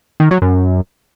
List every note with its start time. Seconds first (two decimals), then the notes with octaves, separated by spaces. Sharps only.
0.20 D#3
0.31 F#3
0.42 F#2